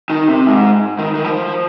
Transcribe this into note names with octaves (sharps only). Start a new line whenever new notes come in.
D#3
C3
G#2
D#3
D#3
F3